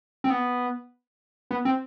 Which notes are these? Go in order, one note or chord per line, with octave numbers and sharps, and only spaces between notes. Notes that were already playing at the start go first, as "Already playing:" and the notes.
C4
B3
B3
C4